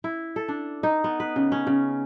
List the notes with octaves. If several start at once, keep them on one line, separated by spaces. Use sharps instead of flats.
E4
A4
D4
D#4
B3
B4
C#3
C#4
C#3